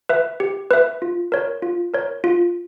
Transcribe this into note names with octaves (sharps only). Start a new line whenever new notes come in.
B4 E5
G4
B4 E5
F4
A#4 C#5
F4
A#4 C#5
F4